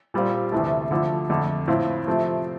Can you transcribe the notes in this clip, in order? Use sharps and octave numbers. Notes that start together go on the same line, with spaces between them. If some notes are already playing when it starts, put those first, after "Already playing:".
A#2 G3 C4 F4
D2 C3 E3 A3
D3 F3 A3 E4
F2 D3 A3
A2 F3 C4 F4
C3 F3 A3 C4